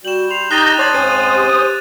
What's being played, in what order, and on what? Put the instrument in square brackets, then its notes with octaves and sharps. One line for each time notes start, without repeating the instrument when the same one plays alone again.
[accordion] G3 G6 [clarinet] F#4 [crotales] E7 F#7
[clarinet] C6 [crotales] F7
[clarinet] D#4 [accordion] G4 D#5 [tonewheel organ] A#5 G6 [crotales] F#6 A6 D#7
[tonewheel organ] C#5 [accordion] D5 A5 A#5 [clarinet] C6 [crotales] D#6 A6 F#7
[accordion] G#2 C4 C#4 [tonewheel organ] C5 D#6 [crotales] D#7
[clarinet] G4